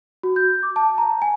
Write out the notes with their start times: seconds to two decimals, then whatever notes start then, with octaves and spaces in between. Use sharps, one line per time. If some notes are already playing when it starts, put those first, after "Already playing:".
0.23 F#4
0.36 G6
0.63 D6
0.76 A5
0.98 A#5
1.22 G#5